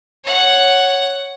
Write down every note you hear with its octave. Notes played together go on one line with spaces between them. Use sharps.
C#5 F#5